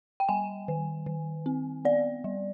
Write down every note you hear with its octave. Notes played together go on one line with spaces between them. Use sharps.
G5
G3 G#5
D#3
D#3
C4
B3 D5
G3